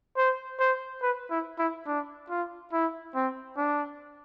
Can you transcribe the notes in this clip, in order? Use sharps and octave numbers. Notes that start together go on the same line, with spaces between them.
C5
C5
B4
E4
E4
D4
F4
E4
C4
D4